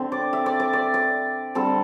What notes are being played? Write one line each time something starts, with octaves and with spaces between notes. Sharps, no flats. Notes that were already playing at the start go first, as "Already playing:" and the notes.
Already playing: D3 C4
D5
E5
D5
D5
D5
D5
D3 G3 C4 A4